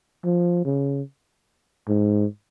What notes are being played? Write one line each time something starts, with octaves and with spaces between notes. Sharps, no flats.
F3
C#3
G#2